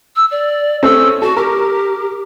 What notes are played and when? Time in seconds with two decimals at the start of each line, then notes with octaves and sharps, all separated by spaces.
0.16 E6
0.31 D5
0.83 A3 C4 C#4 E6
1.22 F#4 A4
1.37 G4 A#4